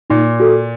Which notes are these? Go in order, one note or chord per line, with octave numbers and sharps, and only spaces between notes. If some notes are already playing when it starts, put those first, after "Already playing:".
A#2 D#4
F#4 A4